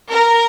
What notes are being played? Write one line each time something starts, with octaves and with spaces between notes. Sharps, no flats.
A#4